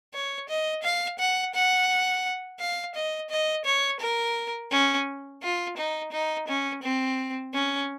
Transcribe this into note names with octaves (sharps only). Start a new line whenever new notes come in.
C#5
D#5
F5
F#5
F#5
F5
D#5
D#5
C#5
A#4
C#4
F4
D#4
D#4
C#4
C4
C#4